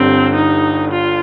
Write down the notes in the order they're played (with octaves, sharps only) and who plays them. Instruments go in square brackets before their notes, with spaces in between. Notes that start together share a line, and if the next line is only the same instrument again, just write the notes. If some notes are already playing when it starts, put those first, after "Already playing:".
Already playing: [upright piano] G1 G2 D3 [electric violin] C4
[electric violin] D#4
F4